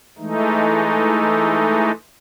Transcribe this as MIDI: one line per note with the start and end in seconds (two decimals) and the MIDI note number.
0.19 1.92 52
0.19 1.92 56
0.19 1.92 57
0.19 1.92 63